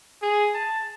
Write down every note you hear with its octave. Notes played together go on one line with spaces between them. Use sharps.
G#4
A5